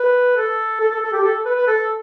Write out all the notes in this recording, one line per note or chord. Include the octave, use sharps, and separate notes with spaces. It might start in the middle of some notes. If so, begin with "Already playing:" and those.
Already playing: B4
A4
A4
A4
A4
G4
A4
B4
B4
A4